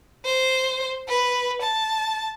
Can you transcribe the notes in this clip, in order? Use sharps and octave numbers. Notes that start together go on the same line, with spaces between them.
C5
B4
A5